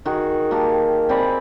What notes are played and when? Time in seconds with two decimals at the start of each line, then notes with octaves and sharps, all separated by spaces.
0.05 D#3 F#4 G#4
0.51 A#3 G4 A5
1.09 C4 D5 G#5 B5